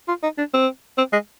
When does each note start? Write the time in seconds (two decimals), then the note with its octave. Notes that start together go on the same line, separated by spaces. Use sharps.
0.08 F4
0.23 D#4
0.38 D4
0.54 C4
0.98 C4
1.13 G#3